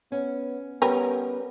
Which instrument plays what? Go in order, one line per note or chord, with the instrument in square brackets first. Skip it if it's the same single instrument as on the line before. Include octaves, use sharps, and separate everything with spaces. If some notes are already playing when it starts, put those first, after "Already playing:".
[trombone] B3 [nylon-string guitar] C#4
[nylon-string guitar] G3 C#4 A#4 [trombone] B3 [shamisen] G4 B4 A#5